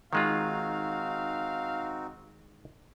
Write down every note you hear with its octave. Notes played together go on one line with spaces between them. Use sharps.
D#3 G#3 C4 D#4 F4 F#4 F5